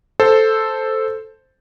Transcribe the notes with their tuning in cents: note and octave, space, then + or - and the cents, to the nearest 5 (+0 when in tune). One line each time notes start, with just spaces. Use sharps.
A4 +0 C5 +0